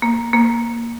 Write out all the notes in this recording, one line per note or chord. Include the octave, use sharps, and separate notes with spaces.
A#3
A#3